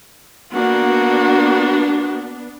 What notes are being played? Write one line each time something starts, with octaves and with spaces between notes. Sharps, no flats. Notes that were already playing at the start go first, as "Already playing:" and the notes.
A#3 B3 D4 F#4